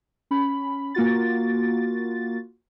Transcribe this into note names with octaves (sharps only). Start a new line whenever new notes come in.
C#4 B5
A#3 F4 F#4 A6